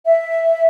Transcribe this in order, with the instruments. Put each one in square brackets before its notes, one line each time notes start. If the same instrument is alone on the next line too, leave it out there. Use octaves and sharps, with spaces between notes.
[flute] E5